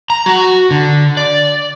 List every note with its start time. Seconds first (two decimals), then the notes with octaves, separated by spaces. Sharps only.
0.10 A#5
0.26 F#4
0.71 D3
1.17 D5